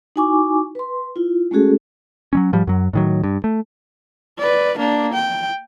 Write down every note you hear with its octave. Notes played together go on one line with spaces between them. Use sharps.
D#4 E4 F#4 G#5 C#6 D6
B4 C6
E4 F4
G#3 A3 C#4 F#4 G#4 A4
F#3 G3 C#4
G#2 F3 G3
F#2 F#3
A2 D#3 F#3
G2
A3
B4 D5
A#3 D4
G5